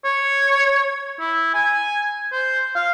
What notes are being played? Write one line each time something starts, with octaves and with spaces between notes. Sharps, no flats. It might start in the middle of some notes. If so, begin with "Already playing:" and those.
C#5
E4
G#5
C5
F5